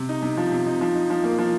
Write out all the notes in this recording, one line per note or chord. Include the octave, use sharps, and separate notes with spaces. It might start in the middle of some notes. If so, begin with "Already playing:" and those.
Already playing: C3
D#4
C3
F3
C3
D#4
F3
D#4
F3
A#3
F3